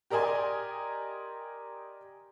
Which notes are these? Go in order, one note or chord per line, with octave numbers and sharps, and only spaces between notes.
G4 A#4 D5 D#5 G#5 C6